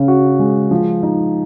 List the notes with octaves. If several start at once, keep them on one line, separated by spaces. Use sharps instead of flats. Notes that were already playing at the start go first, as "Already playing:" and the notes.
Already playing: C#3 C#4
F#4
G#3
F3
D#4